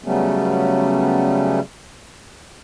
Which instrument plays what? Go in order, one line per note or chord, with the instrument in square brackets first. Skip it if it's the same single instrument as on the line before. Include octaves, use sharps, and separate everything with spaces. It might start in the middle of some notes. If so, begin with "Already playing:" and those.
[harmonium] C#3 F#3 G3 A3 B3 C#4